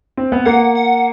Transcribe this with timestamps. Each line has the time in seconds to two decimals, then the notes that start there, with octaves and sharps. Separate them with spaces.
0.17 C4
0.32 B3
0.45 A#3 F#5
0.75 F#5